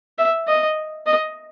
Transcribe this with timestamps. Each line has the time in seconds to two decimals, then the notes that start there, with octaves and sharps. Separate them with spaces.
0.18 E5
0.47 D#5
1.06 D#5